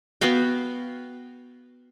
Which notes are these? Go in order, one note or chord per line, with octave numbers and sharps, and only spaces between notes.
B3 F#4 F5 G5